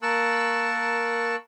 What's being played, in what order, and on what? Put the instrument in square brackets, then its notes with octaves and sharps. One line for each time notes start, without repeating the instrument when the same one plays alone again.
[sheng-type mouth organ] A#3 A#4 A5 C#6 E6 F#6